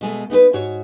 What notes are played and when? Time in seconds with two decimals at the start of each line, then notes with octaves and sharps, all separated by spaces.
0.01 B2 G#3 A3
0.30 B3 D#4 G4 B4
0.53 G#2 F#4 C#5